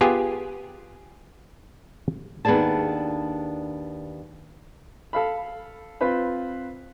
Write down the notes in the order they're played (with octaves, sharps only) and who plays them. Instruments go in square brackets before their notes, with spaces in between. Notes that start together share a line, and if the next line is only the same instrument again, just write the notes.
[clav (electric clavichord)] B3 F4 G4 G#4 G#5
[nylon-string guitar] D#2 B3 D4 G#4 D5 A5
[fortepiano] A4 F5 B5
C4 F4 B4 C5 B5